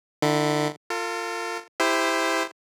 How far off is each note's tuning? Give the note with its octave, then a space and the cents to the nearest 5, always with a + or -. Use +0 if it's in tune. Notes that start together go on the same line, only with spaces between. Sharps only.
D3 +35 E4 +0
F4 +0 A4 +45
E4 +0 G4 +25 C5 -15